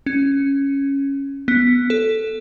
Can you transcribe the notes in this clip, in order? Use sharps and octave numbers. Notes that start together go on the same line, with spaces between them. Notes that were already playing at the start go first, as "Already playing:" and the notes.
C#4
B3
A4